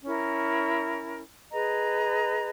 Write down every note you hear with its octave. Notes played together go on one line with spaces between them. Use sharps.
C#4 E4 A#4
G#4 B4 D#5 A#5